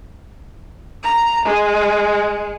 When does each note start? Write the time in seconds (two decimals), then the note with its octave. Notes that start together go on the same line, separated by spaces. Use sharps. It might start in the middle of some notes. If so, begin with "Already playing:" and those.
1.03 A#5
1.45 G#3